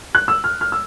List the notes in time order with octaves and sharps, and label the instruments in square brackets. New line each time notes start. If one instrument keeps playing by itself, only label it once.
[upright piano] F#6
E6
F6
F6
E6